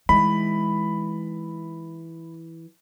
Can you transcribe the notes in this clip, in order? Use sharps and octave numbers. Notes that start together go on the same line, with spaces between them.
E3 G#3 D#4 B5